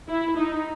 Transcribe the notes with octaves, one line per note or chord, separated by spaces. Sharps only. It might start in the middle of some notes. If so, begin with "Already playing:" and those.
E4
D#4